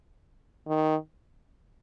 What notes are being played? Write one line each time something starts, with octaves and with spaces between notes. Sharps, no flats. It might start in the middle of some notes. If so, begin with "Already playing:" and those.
D#3